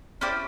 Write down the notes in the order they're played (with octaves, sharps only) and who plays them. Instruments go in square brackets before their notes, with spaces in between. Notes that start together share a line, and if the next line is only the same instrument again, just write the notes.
[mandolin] C#4 E4 G4 C5 D5